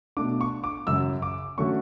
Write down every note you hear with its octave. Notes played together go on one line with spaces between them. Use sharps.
B2 A3 D4 D6
C#6
D6
F#2 C#3 F#3 E6
D6
D3 F#3 A3 C#4 C#6